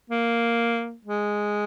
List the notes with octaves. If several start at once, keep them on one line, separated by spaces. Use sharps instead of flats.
A#3
G#3